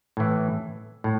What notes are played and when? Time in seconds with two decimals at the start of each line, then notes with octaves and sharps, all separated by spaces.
0.17 A2 E3
1.04 A2